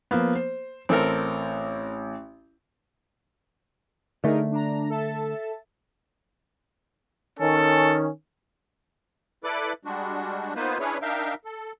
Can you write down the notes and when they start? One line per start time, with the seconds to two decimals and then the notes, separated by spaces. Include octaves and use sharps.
0.11 F3 A#3 B3
0.35 C5
0.89 A1 C4 A4 A#4
4.24 D3 A3 D#4 G#4 A#4
4.51 D4 A#5
4.90 A4 E5 A5
7.39 D#3 C#4 A4
9.44 E4 A4 B4 D5 D6 F#6
9.85 G3 G#3 D4 F#4
10.55 A#3 B3 D#4 F4 B4 C5
10.79 C#4 D4 E4 G#4 B4 C#5
11.02 D4 D#4 A#4 E5 F5 G5
11.45 A4